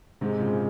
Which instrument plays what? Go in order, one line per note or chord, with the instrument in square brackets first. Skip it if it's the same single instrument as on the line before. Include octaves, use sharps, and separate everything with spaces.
[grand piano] G#2 C3 [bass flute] G#3
[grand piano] A#2 C#3